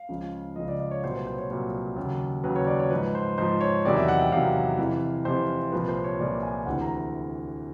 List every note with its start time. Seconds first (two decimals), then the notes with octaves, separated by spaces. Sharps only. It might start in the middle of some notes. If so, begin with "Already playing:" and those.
Already playing: F5
0.09 C#2 C#3 F3
0.56 C#2 C#3 F3 D#5
0.68 D5
0.80 D5
0.91 C#5
1.03 C2 A#2 F#3 C5
1.15 B4
1.27 C5
1.38 C#5
1.50 C2 A#2 F#3 C#5
1.96 D#2 C#3 F#3
2.44 D#2 C#3 F#3 B4
2.56 C#5
2.67 D5
2.79 C#5
2.90 G#2 F3 B4
3.15 C5
3.38 G#2 F3 C5
3.61 C#5
3.85 E2 C3 D#3 F#3 D5
3.96 E5
4.08 F#5
4.19 G5
4.32 E2 C3 D#3 F#3 F5
4.79 F2 C3 E3
5.25 F2 C3 E3 C5
5.72 C2 A#2 F3 B4
5.88 C5
6.04 C#5
6.19 C2 A#2 F3 D5
6.43 G#5
6.66 D2 C3 E3 F#5
6.81 A#5